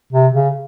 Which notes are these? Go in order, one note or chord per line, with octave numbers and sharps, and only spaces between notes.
C3
C#3